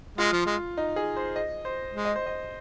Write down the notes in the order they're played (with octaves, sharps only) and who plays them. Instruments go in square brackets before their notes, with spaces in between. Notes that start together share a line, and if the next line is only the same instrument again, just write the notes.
[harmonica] G#3 [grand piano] F4
[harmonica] F3
G#3
[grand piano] D#4
G#4
C5
D#5
C5
[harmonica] G#3
[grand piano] D#5
C5
D#5